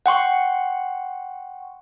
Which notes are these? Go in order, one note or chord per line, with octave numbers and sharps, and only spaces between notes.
F#5 G5 C6 C#6